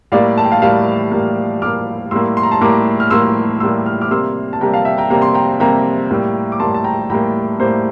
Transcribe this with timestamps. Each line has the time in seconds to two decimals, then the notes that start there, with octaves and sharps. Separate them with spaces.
0.12 A2 G3 A#3 D5 F5
0.38 A5
0.44 G5
0.52 F5 A5
0.62 A2 G3 A#3 F5 A5
1.12 A2 G3 A#3
1.62 A2 G3 A#3 D6 F6
2.11 A2 G3 A#3 C6 E6
2.37 C6
2.43 A#5
2.51 A5 C6
2.61 A2 G3 A#3 A#5 D6
3.00 F6
3.10 A2 G3 A#3 C6 E6
3.60 A2 G3 A#3 C6 E6
3.86 F6
4.01 D6 F6
4.11 C3 G3 A#3 C6 E6
4.53 A5
4.61 C3 G3 A#3 G5 A#5
4.73 F5 A5
4.85 E5 G5
4.98 G5 A#5
5.10 C3 G3 A#3 A#5
5.22 C6
5.34 G5 A#5
5.60 C3 G3 A#3 G5 A#5
6.11 A2 G3 A#3
6.52 D6
6.60 A2 G3 A#3 A5 C6
6.75 A5
6.84 G5 A#5
7.10 A2 G3 A#3 G5 A#5
7.59 A2 G3 A#3 C5